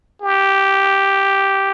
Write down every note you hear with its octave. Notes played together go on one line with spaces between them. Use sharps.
G4